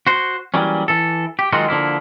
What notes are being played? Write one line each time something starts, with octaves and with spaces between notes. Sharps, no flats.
F#4 C5
E3 F#3 G3 A#3 C#4
E3 A4
G4
D#3 F#3 G#3 D#4 F4 F#4
D3 F3 A#3 E4